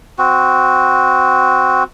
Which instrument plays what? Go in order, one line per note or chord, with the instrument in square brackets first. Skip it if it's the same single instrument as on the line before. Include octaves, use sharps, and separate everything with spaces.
[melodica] C4 F#4